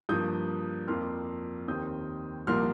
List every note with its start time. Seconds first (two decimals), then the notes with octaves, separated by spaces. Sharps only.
0.09 G2 F3 A#3 D#6 G6
0.88 F2 F3 A#3 C6 F6
1.68 D#2 D#3 C4 D#6 G6
2.47 C2 A#2 F3 A#3 C6 F6